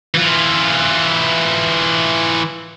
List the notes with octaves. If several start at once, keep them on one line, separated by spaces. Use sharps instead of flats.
E3 F4